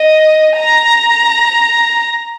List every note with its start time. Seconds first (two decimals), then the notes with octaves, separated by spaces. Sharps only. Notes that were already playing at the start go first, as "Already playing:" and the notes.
Already playing: D#5
0.57 A#5